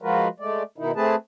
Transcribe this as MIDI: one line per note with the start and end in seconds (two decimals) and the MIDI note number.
0.01 0.28 53
0.01 0.28 56
0.01 0.28 65
0.01 0.28 66
0.01 0.28 70
0.01 0.28 71
0.40 0.63 56
0.40 0.63 57
0.40 0.63 74
0.78 0.92 47
0.78 0.92 51
0.78 0.92 63
0.78 0.92 64
0.96 1.15 57
0.96 1.15 60
0.96 1.15 68
0.96 1.15 71
0.96 1.15 81